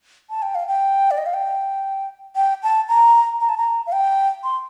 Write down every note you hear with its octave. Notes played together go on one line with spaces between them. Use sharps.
A5
G5
F5
G5
D5
D#5
F5
G5
G5
A5
A#5
A#5
A5
A#5
F5
G5
C6